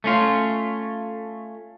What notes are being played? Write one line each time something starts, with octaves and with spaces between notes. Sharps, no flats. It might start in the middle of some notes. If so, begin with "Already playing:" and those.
A3 C#4 F4